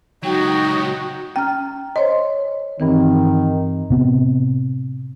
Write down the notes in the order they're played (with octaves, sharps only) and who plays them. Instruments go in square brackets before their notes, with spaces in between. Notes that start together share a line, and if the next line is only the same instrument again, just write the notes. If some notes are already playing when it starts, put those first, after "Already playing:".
[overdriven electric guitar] C#2 F#3 [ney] D#4 [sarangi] F#4 [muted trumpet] G5
[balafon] C#4 G5 [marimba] A#5 F6
[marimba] C5 C#5 C6 [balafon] D#5
[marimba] G2 E3 C4 [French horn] D#3
[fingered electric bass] A2 C3 B3 C4